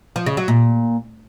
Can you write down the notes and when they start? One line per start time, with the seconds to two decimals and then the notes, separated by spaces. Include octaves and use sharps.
0.16 F3
0.26 C#3
0.37 F#3
0.48 A#2